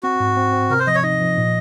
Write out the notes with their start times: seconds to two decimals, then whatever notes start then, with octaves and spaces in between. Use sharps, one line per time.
0.03 C4 F#4
0.20 G#2
0.37 C4
0.53 C4
0.70 C3 A#4
0.79 C5
0.87 F3 D#5
0.95 C#5
1.03 D#4 D#5
1.20 F3
1.37 A#2